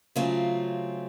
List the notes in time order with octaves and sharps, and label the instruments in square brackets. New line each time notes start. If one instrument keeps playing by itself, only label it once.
[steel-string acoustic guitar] C#3 F#3 A3 C4 F4